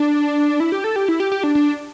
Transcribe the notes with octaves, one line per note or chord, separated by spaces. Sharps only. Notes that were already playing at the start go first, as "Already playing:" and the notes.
Already playing: D4
E4
G4
A4
G4
E4
G4
G4
D4
D4